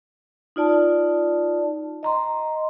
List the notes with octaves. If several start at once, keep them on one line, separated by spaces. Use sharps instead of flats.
D#4 F4 D5 A5
D#5 A#5 C6